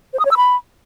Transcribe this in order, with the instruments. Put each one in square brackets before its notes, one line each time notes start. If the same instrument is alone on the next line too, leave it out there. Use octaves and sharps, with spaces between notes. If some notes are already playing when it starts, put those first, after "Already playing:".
[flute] C5
D#6
C#5
E6
B5